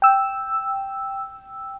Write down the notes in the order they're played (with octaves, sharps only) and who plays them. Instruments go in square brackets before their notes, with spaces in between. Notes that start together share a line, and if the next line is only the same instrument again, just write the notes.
[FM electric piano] G5 E6